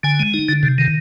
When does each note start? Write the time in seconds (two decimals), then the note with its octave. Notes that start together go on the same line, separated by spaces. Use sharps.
0.03 D3 G#5
0.20 G#3
0.34 D#4
0.49 D3
0.63 C3
0.78 D#3